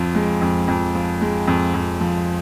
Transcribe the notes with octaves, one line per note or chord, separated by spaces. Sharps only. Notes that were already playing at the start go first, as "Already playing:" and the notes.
Already playing: F2 F3
G#3
F2
F2
F3
G#3
F2
F2
F3